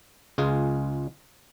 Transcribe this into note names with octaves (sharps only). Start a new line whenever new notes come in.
C#2 G#3 F4 G#4